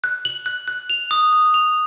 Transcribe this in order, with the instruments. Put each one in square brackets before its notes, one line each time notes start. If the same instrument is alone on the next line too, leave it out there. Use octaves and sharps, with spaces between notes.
[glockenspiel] F#6
F#7
F#6
F#6
F7
D#6
D#6
F7